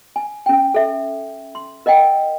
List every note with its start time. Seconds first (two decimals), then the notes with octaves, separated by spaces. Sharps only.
0.16 G#5
0.46 C#4 G5
0.74 A4 E5
1.55 C6
1.86 A#4 D#5 F#5 G5